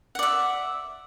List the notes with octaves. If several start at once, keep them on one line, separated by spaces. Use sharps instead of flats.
D5 E5 F#5